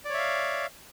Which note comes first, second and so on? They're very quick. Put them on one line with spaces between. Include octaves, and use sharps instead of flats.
D5 C#5 E5 F5